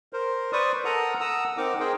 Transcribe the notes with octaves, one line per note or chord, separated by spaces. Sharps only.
A#4 C5
B4 C5 D5 C#6 D#6
A4 A#4 F#5 A#5 D#6
F#5 A#5 D#6 E6
C4 D#4 A#4 F#5 D6
D#4 G#4 A#4 C5 G5